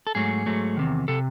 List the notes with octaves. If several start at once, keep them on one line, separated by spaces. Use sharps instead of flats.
A4
G#2 F#3 A3 G#4
G#2 F#3 A3
E2 C3 D#3
C3 A4